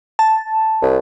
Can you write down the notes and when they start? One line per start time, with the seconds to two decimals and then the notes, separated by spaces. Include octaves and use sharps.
0.19 A5
0.82 C2